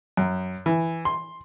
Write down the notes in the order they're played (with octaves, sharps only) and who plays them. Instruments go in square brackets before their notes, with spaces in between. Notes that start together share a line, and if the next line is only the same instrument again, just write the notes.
[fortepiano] F#2
E3
C6